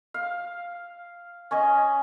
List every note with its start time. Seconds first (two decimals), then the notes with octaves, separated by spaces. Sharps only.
0.14 F5
1.51 C#4 C#5 D#5